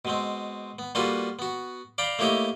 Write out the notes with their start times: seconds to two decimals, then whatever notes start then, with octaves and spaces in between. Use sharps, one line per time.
0.05 B2 G#3 C4
0.79 B3
0.95 G3 A#3 F4 F#4 A4 B4
1.39 B3 F#4
1.98 D5 F5 G5 A#5 B5
2.19 A3 A#3 E4 G4 C#5 D#5